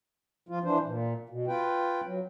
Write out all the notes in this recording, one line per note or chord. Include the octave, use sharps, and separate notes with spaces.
F3 F4
E3 D4 C5
A#2
B2
F4 B4 G5
F#3